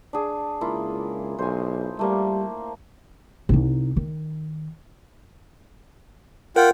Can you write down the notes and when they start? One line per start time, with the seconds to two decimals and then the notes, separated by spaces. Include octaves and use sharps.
0.13 D4 G#4
0.61 C#2 A#3 E4 F4
1.38 B1 C5 G#5
1.99 G3 A3 A#3
3.49 C2 D#4
3.97 D#3
6.56 F4 A#4 F#5 G5